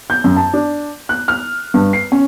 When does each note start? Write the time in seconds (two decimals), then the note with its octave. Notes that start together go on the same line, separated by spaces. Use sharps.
0.10 G6
0.24 F#2
0.37 A5
0.53 D4
1.09 F#6
1.28 F6
1.74 G2
1.93 C7
2.12 C#4